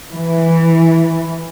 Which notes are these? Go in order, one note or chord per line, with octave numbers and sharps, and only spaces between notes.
E3